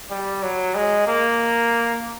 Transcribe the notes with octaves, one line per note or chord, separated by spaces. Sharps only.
G3
F#3
G#3
A#3